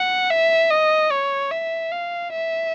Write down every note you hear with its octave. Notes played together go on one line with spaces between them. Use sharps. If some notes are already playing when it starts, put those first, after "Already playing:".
Already playing: F#5
E5
D#5
C#5
E5
F5
E5